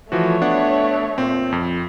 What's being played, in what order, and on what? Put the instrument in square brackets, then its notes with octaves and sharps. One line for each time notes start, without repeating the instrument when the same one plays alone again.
[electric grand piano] E3 F3 F#4 [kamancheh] A3 C#5
[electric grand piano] B3 D4 F#5
A#2 C4
F2